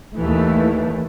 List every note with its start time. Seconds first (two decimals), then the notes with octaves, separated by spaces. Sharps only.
0.19 D#2 E3 A3